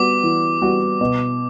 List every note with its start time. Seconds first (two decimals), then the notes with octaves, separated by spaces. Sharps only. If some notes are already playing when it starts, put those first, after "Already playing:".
Already playing: G3 B3 F#4 D6
0.24 E3
0.62 G3 B3 F#4
1.01 B2